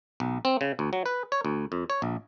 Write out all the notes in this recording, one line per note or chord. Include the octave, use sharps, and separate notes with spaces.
B1
C4
C#3
D2
F#3
B4
C#5
D2
F2
C#5
A#1